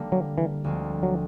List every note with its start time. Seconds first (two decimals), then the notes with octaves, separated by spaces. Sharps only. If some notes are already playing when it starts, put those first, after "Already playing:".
Already playing: D3 G3 A#3
0.12 F#3
0.38 E3
0.64 D2 D3 F3 G#3 C4
1.03 F#3